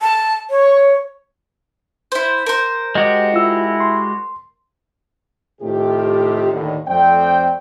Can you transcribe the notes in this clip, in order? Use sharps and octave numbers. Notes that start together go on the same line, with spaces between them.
A5
C#5
E4 C5
A#4 C5
G#3 F#4 G4 D#5
E4 F4 E6
C6
A2 C3 D#3 F4 G4
D#2 A2 D3 D#3
F2 A3 C4 D5 G5